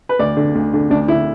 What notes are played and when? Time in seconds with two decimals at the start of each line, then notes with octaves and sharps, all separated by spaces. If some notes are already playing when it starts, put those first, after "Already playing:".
0.09 B4
0.19 D2 D5
0.37 D3
0.55 D2
0.73 D3
0.90 D2 D4
1.08 D3 E4